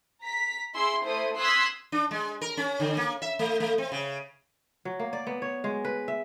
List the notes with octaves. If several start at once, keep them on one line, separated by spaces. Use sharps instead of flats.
A#5 B6
E4 G#4 C6 E6
A3 E4 C5 D#6
C6 D#6 E6 F#6 G#6 B6
D4
G#3
A#4
C#4
D3
A#3
E5
A3
A3
C4
C#3
F#3
A#3
D5
B3
C#5
G#3
B4
E5